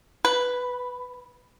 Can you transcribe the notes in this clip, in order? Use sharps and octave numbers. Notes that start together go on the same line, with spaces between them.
B4